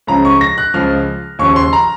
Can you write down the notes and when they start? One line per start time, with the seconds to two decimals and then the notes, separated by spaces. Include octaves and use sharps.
0.07 C#2 C#3 F3 A#5
0.25 C#6
0.41 A#6
0.58 F#6
0.74 C#2 C#3 F3 F6
1.39 D#2 C#3 F3 C#6
1.56 C6
1.73 A#5